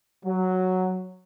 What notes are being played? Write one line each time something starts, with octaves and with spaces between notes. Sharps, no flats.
F#3